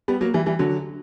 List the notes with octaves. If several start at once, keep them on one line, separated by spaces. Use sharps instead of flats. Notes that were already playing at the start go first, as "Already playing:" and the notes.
G3 B3
F#3 A#3
E3 G3
E3 G3
D3 F#3